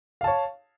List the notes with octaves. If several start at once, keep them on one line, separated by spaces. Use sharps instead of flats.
C#5 F5 A5